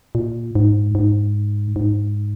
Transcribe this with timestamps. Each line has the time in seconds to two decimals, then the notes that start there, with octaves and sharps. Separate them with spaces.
0.15 A#2
0.55 G#2
0.95 G#2
1.76 G#2